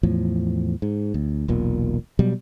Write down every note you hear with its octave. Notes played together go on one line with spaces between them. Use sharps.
E2 A2 F3
G#2
D2
E1 B1 A#2
B2 F#3 G3